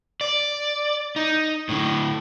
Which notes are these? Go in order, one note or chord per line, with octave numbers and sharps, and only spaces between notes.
D5
D#4
A2 D3